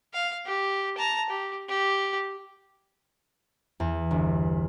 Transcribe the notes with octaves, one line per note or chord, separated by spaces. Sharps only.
F5
G4
A5 A#5
G4
G4
E2
G1